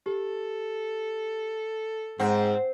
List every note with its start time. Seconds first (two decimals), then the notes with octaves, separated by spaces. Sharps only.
0.06 G4 A4
2.20 G#2 C4 F#5